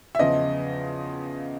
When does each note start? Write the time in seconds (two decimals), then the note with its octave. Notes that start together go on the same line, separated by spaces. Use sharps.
0.15 E5
0.19 E2 C#3 F3 D#5